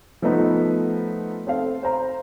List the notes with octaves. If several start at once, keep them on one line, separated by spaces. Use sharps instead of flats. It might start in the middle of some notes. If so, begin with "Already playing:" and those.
F3 A3 B3 D#4 B4
C4 A4 F5
C5 A#5